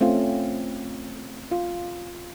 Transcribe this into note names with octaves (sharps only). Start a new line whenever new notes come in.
A3 C4 C#4 F4
F4